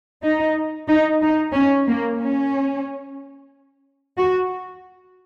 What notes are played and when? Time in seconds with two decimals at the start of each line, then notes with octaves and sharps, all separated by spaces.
0.24 D#4
0.88 D#4
1.22 D#4
1.54 C#4
1.88 A#3
2.20 C#4
4.18 F#4